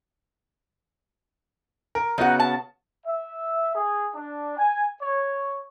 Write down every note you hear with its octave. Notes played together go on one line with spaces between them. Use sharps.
A#4
C#3 B3 D#4 F#4 F#5
A5
E5
G#4
D4
G#5
C#5